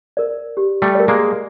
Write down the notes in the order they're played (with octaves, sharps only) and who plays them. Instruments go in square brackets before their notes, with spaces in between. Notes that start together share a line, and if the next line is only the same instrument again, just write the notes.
[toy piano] A#4 D5
G4
[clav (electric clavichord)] G3 A3
[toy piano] A#4 D5
[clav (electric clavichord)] G#3 A#3